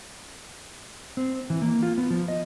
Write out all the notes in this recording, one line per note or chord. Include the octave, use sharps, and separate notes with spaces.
C4
E3
A#3
F4
B3
F3
D#5